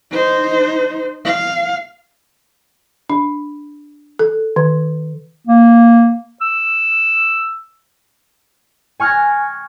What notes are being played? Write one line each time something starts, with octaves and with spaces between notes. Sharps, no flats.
D#4 C5
F5
D4
A4
D#3
A#3
E6
G#5 C#6 F6 F#6 G#6 A#6